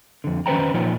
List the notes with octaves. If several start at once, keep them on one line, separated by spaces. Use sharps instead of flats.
F2 D3
D#3 C#4 B4 C5 G5 A#5
A#2 F3 D#4 F4 C#5 G5